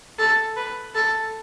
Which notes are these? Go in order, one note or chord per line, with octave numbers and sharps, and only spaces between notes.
A4
B4
A4